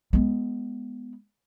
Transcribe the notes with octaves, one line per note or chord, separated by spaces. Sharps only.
G#3 B3